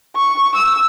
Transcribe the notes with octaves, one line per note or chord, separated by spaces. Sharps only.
C#6
E6